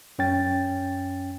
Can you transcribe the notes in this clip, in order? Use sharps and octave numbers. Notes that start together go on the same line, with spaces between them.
F#2 C#4 G5 A6